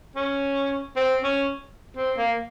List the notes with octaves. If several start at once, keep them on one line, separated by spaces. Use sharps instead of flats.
C#4
C4
C#4
C4
A#3